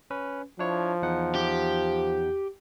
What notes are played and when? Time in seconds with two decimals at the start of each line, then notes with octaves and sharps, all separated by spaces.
0.11 C#4 B4
0.59 F3 D4 E4 C#5
1.02 E2 D#4 F#5
1.35 G4